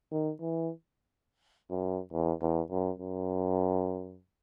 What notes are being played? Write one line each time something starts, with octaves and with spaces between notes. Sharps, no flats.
D#3
E3
F#2
E2
E2
F#2
F#2